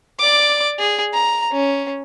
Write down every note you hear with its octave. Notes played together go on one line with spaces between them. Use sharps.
D5 D6
G#4
A#5
C#4